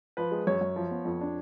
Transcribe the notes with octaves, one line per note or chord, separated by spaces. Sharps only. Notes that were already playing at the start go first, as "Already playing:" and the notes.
F3 B4
G#3
F#2 C#5
F#2
F3
B3
F2
D4